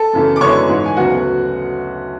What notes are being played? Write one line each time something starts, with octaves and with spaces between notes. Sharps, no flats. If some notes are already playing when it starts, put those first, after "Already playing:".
Already playing: A4 A5
F#2 C#3 E3 A3
D6
F#2 D3 G#3 B3 E4 C#5 C#6
G#2 E3 A3
G#5
D2 C#3 F#3 B3 F#4 F#5